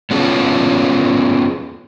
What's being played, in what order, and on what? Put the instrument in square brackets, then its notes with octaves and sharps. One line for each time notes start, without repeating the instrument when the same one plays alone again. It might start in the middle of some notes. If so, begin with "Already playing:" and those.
[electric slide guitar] B3 C#4 F4 G#4 A4